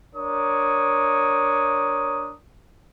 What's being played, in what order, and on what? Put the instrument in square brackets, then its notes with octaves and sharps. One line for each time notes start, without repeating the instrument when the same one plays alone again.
[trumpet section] D4 A#4 C#5 D#6